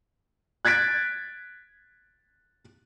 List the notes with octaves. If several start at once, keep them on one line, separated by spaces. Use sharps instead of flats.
F#6 G#6 A6 B6 D7